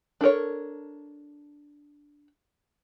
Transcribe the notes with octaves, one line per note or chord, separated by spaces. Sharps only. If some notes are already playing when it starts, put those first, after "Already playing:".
D4 A4 A#4 C#5